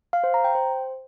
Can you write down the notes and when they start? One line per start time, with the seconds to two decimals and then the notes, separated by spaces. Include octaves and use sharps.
0.13 F5
0.24 C5
0.34 A#5
0.44 G5
0.55 C5